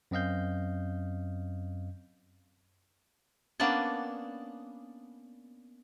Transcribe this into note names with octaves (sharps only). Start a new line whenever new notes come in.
F#2 C4 D#5 F5 G6
A#3 B3 C#4 D4 D5 A5